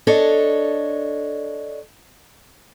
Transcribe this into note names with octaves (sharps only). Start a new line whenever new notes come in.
D4 A4 C#5 D#5